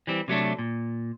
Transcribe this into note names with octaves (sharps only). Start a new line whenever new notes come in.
E3 G3 C4
C3 F#3 A3 D4
A#2